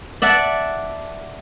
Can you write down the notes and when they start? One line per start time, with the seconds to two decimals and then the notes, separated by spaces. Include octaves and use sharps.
0.22 D5 E5 F#5 A5